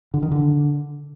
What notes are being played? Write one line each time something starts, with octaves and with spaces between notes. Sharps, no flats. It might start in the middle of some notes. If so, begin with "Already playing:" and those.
D3
D#3
D3